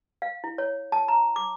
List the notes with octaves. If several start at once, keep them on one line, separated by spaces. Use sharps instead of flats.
F5
E4
C#5
A5
A#5
D6